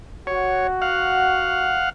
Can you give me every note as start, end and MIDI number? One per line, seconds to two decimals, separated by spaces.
0.27 1.81 66
0.27 0.67 73
0.82 1.90 77
0.82 1.90 78